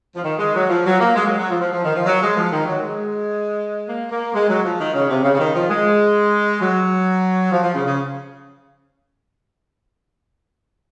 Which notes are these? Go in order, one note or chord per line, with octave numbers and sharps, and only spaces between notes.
F3
D#3
G#3
F#3
F3
F#3
A#3
G#3
F#3
F#3
F3
F3
F3
D#3
F3
F#3
G#3
F3
D#3
F#3
G#3
A#3
A#3
G#3
F#3
F3
D#3
C#3
C3
C#3
C#3
D#3
F3
G#3
F#3
F3
F3
C#3
C#3